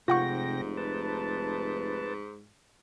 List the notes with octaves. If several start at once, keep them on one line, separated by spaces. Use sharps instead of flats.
F1 G#2 C3 F4 F#5 G5 C#6 A#6
B4 A5